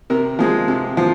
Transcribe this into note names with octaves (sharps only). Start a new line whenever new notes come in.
C3 A#4
F3 G#3
C3
F3